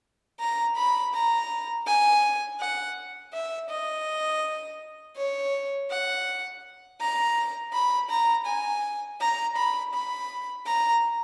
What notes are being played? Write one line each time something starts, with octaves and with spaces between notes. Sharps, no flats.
A#5
B5
A#5
G#5
F#5
E5
D#5
C#5
F#5
A#5
B5
A#5
G#5
A#5
B5
B5
A#5